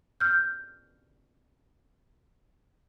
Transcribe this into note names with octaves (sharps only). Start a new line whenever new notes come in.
F6 G6